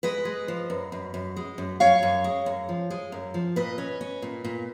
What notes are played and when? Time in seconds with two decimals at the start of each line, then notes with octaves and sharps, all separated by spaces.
0.03 G#3 B4 D#5
0.25 G#3
0.48 F3
0.70 F#2
0.92 F#2
1.14 F#2
1.37 G#3
1.58 F#2
1.80 F#2 C#5 F5
2.03 F#2
2.24 G#3
2.46 F#2
2.69 F3
2.90 G#3
3.12 F#2
3.34 F3
3.56 A#2 B4 D#5
3.78 C#4
4.01 C#4
4.22 A#2
4.44 A#2